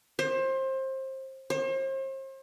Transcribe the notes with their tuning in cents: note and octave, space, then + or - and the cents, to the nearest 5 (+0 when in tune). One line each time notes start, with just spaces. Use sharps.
C5 +25
C5 +40